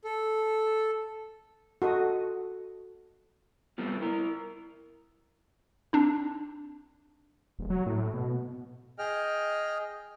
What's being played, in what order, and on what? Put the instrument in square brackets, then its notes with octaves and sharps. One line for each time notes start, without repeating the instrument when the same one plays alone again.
[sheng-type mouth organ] A4
[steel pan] F#4 A4 D#5 D#6
[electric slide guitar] G3 A3 B3 C4 F4
E4 A#4
[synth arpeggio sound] C4 D4 D#4
[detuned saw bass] D#1
F#3
A2
B2
[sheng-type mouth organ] G#4 D#5 G5 F6